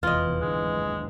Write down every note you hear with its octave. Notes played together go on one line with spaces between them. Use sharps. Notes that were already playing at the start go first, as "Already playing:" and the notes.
F1 E2 E3 F4 D#5
D#2 G#2 D3 G#3